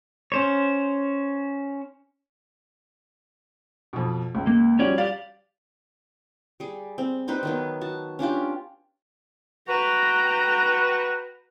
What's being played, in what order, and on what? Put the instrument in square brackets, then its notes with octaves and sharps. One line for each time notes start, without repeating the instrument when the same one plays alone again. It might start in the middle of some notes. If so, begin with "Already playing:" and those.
[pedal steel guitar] C#4 C5 C#5
[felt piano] F2 B2
C#2
[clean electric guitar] A#3
[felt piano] F3 G3 F#4 [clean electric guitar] C#4 C#5 D5
[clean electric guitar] G4 D5 [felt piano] F5
[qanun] G3 G#4
C4
G3 D#4 B4 C5
D#3 F#3 B3
F#4 A5
C#4 D4 F4 G4
[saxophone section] F#4 B4 [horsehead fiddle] G5 A#5